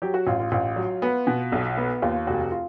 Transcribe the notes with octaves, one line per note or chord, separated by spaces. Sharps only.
F#3 G4
F#4
A1 F4
F4
A1 F4
F#3
B3
B2
B1
B3
D#2 F4
F1 F#4
F4